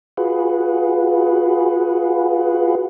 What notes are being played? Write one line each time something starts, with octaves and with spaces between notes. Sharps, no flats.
F4 F#4 G#4 B4